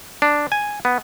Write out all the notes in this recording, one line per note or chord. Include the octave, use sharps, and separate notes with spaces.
D4
G#5
B3